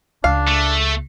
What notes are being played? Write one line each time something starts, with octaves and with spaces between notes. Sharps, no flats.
C#2 D4 F5
A3